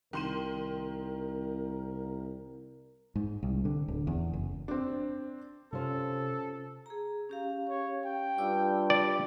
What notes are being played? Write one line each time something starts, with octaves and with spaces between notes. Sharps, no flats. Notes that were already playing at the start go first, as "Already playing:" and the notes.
C2 D#3 A#4 C6 D#7
G#2
C2
D3
D1
E2
F#1
C4 D4
C3 C#4 F4 A4 C5
G#4 A#5
C#4 G4 F5
C#5
G5
G2 F4 D6 E6
G4 D5